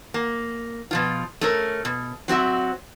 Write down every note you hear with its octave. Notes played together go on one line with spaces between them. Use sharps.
A#3
B2 F3 F4
A3 C#4 A#4
B2
F#3 C4 F#4 E5